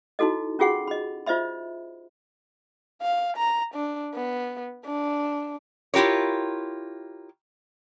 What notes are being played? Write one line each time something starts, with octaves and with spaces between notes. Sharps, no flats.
D#4 E4 F#4 A4 D#5
C#4 F4 F#4 G#4 F#5 C#6
D#5 B5
F4 C5 D#5 E5 B5
F5
A#5
D4
B3
D4
E4 F4 G4 A#4 C#5